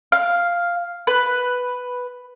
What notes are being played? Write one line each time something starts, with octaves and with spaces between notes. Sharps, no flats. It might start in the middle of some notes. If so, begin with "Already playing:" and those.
F5
B4